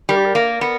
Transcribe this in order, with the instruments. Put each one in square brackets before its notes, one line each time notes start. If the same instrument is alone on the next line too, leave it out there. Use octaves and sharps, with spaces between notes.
[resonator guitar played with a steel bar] G3 [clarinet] A#4
[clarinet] G4
A#4
[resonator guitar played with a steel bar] A#3
B3